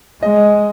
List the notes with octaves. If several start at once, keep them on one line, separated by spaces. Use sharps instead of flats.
G#3 D#5